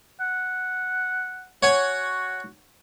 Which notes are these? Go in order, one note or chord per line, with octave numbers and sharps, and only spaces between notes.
F#5
F#4 C#5 F#5 G#5